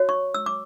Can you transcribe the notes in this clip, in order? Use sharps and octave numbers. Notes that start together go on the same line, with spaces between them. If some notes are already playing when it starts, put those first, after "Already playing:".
Already playing: F#4 C#5
C#6
E6
D6